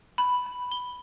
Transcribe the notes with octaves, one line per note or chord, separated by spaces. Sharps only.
B5
B5
G7